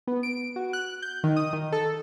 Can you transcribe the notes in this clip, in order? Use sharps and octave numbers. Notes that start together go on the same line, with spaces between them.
B3
D7
F#4
F#6
G6
D#3
D#6
D#3
A4